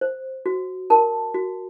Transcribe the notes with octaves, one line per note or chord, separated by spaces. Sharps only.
C5
F#4
A#4 A5
F#4